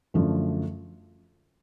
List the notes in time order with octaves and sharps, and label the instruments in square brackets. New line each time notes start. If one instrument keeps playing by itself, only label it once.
[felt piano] F#2 D3 F3 A3